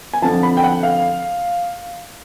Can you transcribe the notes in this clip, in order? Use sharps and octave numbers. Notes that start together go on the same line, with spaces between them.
G#5
F2 D3 F3 A5
B5
G5
F#5
F5